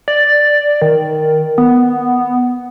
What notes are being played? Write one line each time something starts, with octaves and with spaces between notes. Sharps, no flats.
D5
D#3
B3